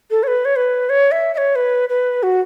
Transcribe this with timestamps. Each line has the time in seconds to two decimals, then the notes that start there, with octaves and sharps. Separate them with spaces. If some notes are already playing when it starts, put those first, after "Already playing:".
0.11 A4
0.23 C#5
0.27 B4
0.45 C#5
0.56 B4
0.89 C#5
1.11 E5
1.34 E5
1.37 C#5
1.55 B4
1.89 B4
2.23 F#4